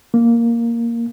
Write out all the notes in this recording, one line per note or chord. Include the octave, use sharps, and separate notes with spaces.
A#3